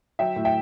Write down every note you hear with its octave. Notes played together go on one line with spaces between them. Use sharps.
F#3 E5 G5
A2
E5 G5